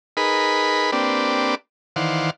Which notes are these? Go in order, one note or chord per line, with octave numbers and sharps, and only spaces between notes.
D#4 G#4 A#4 B4 B5
A#3 C4 D4 G4 B4 D5
D#3 E3 C5 D5 F5 F#5